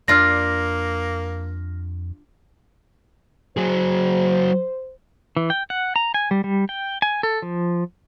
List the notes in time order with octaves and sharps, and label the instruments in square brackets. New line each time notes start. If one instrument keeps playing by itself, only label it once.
[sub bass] F2 [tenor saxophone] A#3 [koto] D4 F4 [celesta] F6 A#6
[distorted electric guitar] F#3 G#4 [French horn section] C5
[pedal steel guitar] E3
G5
F#5
A#5
G#5
G3
G3
G5
G#5
A4
F3